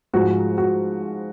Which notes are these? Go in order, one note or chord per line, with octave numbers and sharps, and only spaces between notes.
G#2 F3 G#3 F#4
F#4